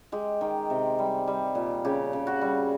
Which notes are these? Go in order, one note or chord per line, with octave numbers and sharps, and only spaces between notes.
G#3 G4
D#3
C3
G3
G3
A#2
C#3 G4
C#3
F#4
G3